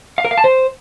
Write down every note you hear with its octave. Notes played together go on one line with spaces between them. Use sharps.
F5
A#4
F5
A5
C5